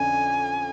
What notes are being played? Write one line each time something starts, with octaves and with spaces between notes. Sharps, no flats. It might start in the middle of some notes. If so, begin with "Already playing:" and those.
Already playing: F2 D3 C#4 G#5